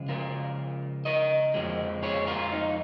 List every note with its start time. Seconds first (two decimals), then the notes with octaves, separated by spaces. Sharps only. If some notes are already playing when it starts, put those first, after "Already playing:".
Already playing: C#3 F3 G#3
0.09 F4 A#4
1.05 A#4 D#5
1.54 F2 F3 G#3
2.03 G#4 C#5
2.27 F4 A#4
2.52 D#4